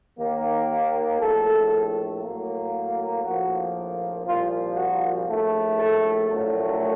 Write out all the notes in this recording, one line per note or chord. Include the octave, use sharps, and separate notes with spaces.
D#2 D#3 A#3
A#1 A2 A3 A4
A2 F#3 A#3
A#1 A2 F3 A#3 F#4
C2 A#2 F3 A#3 F4
F#4
A#1 A2 A3
A4
A#1 A2 F#3 A3